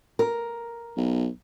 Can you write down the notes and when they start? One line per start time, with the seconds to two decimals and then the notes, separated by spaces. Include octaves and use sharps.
0.19 A#4
0.97 B1